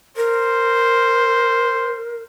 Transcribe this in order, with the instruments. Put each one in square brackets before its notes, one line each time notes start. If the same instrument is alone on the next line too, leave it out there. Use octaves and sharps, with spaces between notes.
[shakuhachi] A#4 [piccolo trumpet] C5